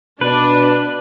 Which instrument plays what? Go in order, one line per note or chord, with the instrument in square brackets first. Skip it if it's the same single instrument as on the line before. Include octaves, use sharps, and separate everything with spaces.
[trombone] B2 [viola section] D4 [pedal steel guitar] B4